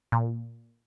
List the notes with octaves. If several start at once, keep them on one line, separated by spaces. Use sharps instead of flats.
A#2